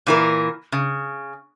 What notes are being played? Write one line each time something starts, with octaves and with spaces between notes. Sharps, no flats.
A#2 E3 A#4
C#3